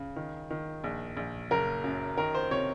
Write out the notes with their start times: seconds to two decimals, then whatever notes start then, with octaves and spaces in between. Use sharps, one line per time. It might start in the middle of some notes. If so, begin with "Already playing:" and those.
Already playing: C#3
0.16 D#3
0.50 D#3
0.84 A#1
1.17 A#1
1.51 F#1 A#4
1.84 F#2
2.18 D#3 A#4
2.35 C5
2.51 C3 C#5